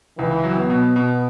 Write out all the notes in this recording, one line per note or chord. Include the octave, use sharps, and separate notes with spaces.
C#2 E3
F#3
B3
B2
B2